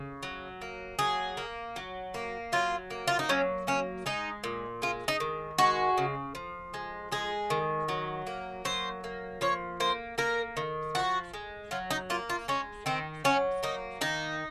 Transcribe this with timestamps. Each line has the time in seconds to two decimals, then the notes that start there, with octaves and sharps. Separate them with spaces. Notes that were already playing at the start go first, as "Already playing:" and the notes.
Already playing: C#3
0.23 F#3
0.61 A#3
0.99 F#3 G#4
1.37 A#3
1.76 F#3
2.14 A#3
2.52 F#3 F4
2.90 A#3
3.08 F4
3.19 D#4
3.29 F#3 C#4
3.67 A#3 C#4
4.06 G#3 D#4
4.44 A#2
4.82 G#3 F4
5.08 D#4
5.20 D#3
5.58 G#3 F#4
5.98 C#3
6.35 F3
6.74 G#3
7.12 G#3 G#4
7.50 D#3
7.88 F#3
8.27 A#3
8.65 F#3 C5
9.04 A#3
9.41 F3 C#5
9.80 A#3 C5
10.18 A#3 A#4
10.57 D#3
10.95 F3 F#4
11.34 G#3
11.71 F#3 F4
11.90 D#4
12.10 A#3 F4
12.30 F4
12.48 G#3 C#4
12.86 D#3 C4
13.24 F#3 C#4
13.63 A#3 D#4
14.01 D#3 D#4